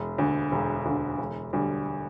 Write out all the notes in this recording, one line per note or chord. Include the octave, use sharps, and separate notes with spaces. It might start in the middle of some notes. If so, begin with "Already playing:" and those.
Already playing: E1
D2 D3
E1
D2 D3
E1
D2 D3 G3